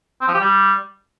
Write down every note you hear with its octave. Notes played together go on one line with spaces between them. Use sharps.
C4
F3
G4
G3